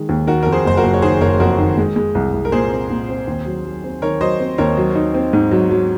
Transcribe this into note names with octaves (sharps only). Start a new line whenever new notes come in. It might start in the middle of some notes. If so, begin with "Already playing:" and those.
Already playing: D#3 G#3
D#2
D#3 F#4 A#4
F2 A#4
G#4 C5
F#1 C5
F#4 A#4
F#1
C#5
D#3 G#4 C5
F#1 A#4 C#5
F2 F#4 A#4
D#3
G#3
G#3
C2
C2
A#4
A#2 G#4 C5
C4
A#2
C4
D#2
F#3
F#3
C4
D#3 A#4 C#5
F#3 C5 D#5
C4
D#2 A#4 C#5
F#3
D#4
C4
G#2
F#3
F#3